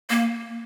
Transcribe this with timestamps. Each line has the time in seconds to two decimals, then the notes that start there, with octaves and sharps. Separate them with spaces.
0.10 A#3